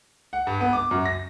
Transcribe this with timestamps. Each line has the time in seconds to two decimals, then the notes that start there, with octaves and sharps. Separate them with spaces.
0.33 F#5
0.47 G2
0.60 B3
0.73 D6
0.91 F#2
1.06 A#6